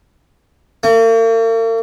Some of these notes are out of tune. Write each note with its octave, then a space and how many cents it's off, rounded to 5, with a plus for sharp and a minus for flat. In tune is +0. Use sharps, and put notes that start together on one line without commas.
A#3 -45